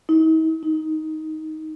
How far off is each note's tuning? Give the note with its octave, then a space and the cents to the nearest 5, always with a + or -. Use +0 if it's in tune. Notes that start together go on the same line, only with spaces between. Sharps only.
D#4 +45
D#4 +10